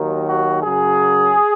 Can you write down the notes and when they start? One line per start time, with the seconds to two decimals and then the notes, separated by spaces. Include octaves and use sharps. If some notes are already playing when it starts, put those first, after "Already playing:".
Already playing: D#2 D#3 F#3
0.28 F#4
0.63 F#2 C#3 F#3 G#4